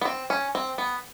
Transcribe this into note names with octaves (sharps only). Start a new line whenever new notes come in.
B3
C4
C#4
C4
B3